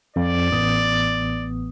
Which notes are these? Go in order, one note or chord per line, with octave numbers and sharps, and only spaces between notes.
F2 D5
A1 B3 D#6